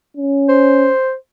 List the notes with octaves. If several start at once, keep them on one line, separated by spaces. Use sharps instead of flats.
C#4
C5